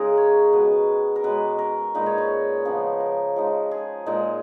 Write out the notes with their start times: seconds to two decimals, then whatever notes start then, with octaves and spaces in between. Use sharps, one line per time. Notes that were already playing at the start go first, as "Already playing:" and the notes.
Already playing: C#3 G#3 D#4 G#4 A#4
0.17 C#5
0.53 B2 G#3 C#4 B4
1.16 A#4
1.23 B2 G#3 C#4 B4
1.58 A#4
1.95 A#2 G#3 D#4 B4
2.06 C#5
2.18 C#5
2.65 C#3 F3 B3
3.00 A#4
3.36 F3 G#3 D#4
3.71 G#4
4.06 A#2 G#3 D#4